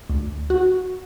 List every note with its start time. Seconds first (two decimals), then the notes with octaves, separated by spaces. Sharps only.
0.10 D2
0.50 F#4